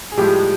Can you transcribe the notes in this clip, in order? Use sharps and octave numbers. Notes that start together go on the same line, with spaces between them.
G#4
A2 F3 G3 G#3 G4